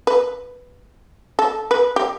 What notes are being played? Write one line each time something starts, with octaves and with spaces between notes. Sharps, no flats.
B4
A4
B4
G4